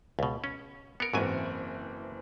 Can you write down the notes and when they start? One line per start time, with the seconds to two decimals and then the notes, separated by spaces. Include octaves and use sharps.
0.19 C#2 B2
0.44 C#4
1.00 B3 A#4 C#7 D7
1.14 F#1 G#2 E3 F#3 C4 G#5